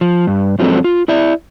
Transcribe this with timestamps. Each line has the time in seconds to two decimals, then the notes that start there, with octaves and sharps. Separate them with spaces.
0.01 F3
0.27 G2
0.59 F2 F3 F#3 G#3 C4 A4
0.84 F4
1.08 E4 D5 E5